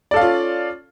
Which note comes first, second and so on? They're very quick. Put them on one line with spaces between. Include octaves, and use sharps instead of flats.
D5 A4 F5 C#4 F4